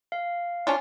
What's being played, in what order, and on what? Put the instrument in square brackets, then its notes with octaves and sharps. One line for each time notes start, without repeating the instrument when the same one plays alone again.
[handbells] F5
[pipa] C#4 D4 F4